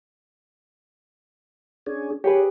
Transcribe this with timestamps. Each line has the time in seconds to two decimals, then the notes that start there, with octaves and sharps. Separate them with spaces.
1.86 C#4 D4 G#4
2.24 G4 G#4 B4 C#5